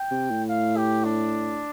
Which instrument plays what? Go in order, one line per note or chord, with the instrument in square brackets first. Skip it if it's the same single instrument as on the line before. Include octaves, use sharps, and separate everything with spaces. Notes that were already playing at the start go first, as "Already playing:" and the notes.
Already playing: [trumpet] G5
[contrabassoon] C3
A2
[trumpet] F5
G4
D4